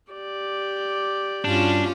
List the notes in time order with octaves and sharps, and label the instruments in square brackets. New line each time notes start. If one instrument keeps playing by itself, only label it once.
[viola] G4 D5
[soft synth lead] G2 [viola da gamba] C#4 F4 F#4 [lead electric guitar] D4